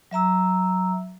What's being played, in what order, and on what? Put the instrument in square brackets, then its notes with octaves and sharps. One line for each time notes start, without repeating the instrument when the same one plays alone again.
[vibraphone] F#3 E5 A#5 E6